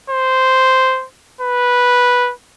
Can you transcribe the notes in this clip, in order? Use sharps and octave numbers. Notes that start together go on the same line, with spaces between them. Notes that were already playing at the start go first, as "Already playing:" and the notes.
C5
B4